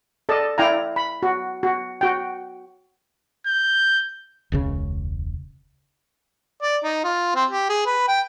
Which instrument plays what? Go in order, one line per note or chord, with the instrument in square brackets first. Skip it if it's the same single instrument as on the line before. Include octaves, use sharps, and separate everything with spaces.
[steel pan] A4 D5 D#5 A5
E4 D5 F5 G5 G#5 A#5
B5
F#4
F#4
F#4 G5
[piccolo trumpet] G6
[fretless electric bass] E1 C#2 C#3
[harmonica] D5
D#4
F4
C4
G4
G#4
B4
G5